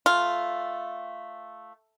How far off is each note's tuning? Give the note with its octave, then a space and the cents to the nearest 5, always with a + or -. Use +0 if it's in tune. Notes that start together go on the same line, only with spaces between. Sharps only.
A3 +0 F4 +0